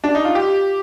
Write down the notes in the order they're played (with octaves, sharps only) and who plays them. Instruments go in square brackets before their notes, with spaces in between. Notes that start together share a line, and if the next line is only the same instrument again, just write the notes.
[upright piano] D4
D#4
F4
G4